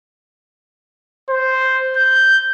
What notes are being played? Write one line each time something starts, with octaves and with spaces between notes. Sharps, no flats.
C5
G6